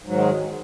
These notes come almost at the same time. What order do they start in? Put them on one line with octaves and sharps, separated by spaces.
G#2 F#3 D#3 G#3